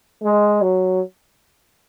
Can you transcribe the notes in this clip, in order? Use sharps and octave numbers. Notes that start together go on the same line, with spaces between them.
G#3
F#3